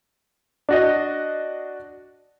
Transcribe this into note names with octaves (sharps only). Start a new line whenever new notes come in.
D4 F#4 D#5